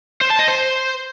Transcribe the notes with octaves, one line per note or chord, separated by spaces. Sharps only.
C5
A5
D#5
C5